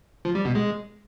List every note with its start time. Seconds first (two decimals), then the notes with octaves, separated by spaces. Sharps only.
0.25 F3
0.35 G3
0.45 B2
0.55 G#3